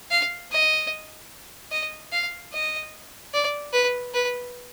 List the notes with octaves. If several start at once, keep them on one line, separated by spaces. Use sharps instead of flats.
F5
D#5
D#5
F5
D#5
D5
B4
B4